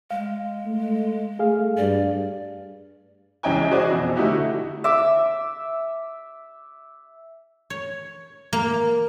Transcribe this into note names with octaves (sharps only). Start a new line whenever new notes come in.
G#3 F5
A3
A3 G#4 F5
G2 D5
C#2 E3 C#4 D#5 G5 G#5
F#4 G#4 C5 D5 D#5 G#5
F2 B2
D3 A3 D#4 E4 F#4 G4
E5 D6
C#5
A#3